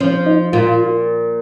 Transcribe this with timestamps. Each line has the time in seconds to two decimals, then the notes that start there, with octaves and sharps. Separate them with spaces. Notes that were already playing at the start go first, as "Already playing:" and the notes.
0.01 F3 C#4
0.26 D#4
0.52 A#2 F4